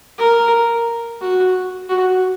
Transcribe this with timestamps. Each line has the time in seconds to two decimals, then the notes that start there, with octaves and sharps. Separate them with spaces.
0.18 A#4
1.21 F#4
1.89 F#4